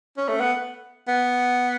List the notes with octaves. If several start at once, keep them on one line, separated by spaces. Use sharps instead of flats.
C#4
A3
B3
B3